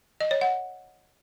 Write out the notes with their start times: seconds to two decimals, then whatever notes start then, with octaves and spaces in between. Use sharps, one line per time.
0.21 D#5
0.31 C#5
0.41 F#5